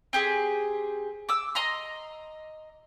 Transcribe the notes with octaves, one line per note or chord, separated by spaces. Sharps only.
C4 G4 G#4
D6 E6
D#5 A#5 C6